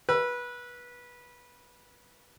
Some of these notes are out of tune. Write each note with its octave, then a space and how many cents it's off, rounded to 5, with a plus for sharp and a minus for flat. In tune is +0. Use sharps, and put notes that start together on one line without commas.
B4 -20 E6 +25